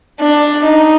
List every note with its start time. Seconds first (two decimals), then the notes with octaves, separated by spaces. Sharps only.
0.21 D4
0.66 D#4